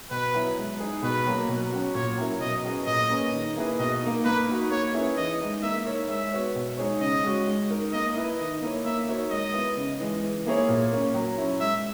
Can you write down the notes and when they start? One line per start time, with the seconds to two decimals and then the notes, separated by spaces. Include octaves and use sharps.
0.11 B2 B4
0.34 F#3 B3 E4
0.58 G#3
0.80 D#4 G#4
1.03 B2 B4
1.27 F#3 A#3
1.49 B2
1.72 F#3 C#4 F#4
1.95 A#2 C#5
2.18 F#3 C#4 E4 A#4
2.41 B2 D#5
2.65 F#3 C#4 G#4 B4
2.87 A#2 D#5
3.10 A#3 C#4 G#4 B4
3.33 D#3
3.56 A#3 E4 G#4 B4
3.79 B2 D#5
4.02 A#3 D#4
4.25 A#3 B4
4.48 D#4 F#4
4.70 A#3 C#5
4.94 C#4 E4 G#4 B4
5.17 E3 D#5
5.41 G#3 D#4
5.63 A#3 E5
5.85 D#4 A#4 C#5
6.09 G#3 E5
6.32 B3 F#4 C#5
6.55 B2
6.77 G#3 D#4 G#4 C#5
7.01 C#3 D#5
7.24 G#3 C#4 F#4
7.47 G#3
7.70 D#4 A#4
7.93 A#3 D#5
8.16 E4 B4
8.38 D#3 D#5
8.61 A#3 E4 A#4 C#5
8.85 A#3 E5
9.07 D#4 F#4 A#4 C#5
9.31 G#3 D#5
9.53 B3 E4
9.77 C#3
10.00 E3 G#3
10.22 E3
10.46 A#3 E4 G#4 C#5
10.69 A#2
10.92 A#3 C#4
11.14 F#3
11.38 C#4 E4
11.61 G#3 E5